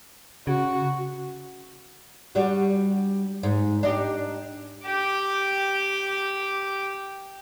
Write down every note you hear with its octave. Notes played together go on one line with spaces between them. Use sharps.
C#3 F#4
G3 D4 F#4
G#2
D4 D#4 G4
G4 D6